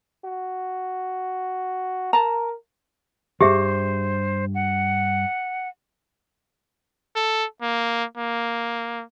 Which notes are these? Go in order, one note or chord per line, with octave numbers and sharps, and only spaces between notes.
F#4
A#4 A5 A#5
E2 G2 G4 G#4 C5 E5
F#5
A4
A#3
A#3